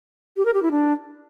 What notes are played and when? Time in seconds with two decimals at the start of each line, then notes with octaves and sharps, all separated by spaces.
0.37 G4
0.45 A#4
0.54 G4
0.63 E4
0.71 D4